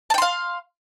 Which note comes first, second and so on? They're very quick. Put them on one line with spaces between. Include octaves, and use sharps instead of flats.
A5 G5 C6 F5